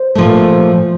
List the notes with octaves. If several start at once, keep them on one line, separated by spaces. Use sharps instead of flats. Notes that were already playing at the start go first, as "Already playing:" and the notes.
Already playing: C5
A#2 F3 A3